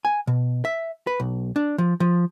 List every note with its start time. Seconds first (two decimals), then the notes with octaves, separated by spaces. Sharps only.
0.05 G#5
0.27 B2
0.65 E5
1.07 B4
1.20 B1
1.56 D4
1.78 F3
2.00 F3